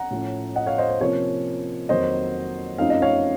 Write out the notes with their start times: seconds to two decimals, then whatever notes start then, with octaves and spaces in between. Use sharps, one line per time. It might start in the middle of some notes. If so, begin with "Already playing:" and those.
Already playing: F#5 A#5
0.11 A2 F3 A3 C#4
0.56 D#5 F#5
0.66 C#5 F5
0.78 C5 D#5
0.89 C5
1.00 C3 F3 A#3 C#4 C#5
1.89 F2 D#3 F#3 A#3 C5 D#5
2.78 F#2 F3 A3 C4 D#4 F5
2.90 D#5
3.02 C#5 F5